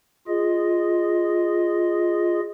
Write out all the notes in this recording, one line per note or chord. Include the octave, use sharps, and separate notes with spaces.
F4 G#4 D#5